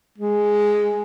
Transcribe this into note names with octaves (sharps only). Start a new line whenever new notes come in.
G#3